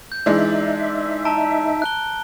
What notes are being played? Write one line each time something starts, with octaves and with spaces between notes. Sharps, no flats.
G6
E3 G#3 D4 D#4 E5
A5 A#5 D7
F#6 G7